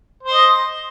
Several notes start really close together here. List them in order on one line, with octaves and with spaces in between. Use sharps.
C5 C6 D#5